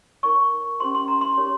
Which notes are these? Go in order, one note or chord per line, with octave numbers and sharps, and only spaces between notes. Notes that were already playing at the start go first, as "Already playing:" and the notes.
D#4 A#4 C#5 C#6
C#4 G4 C5 C6
C6
A#5
C6
D#4 G4 A#4 C#5